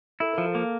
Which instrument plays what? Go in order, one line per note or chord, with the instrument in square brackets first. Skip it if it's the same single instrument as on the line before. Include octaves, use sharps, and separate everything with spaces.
[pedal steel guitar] E4 [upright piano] A4
[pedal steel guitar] F3 [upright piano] A#4
[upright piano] A4
[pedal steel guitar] A#3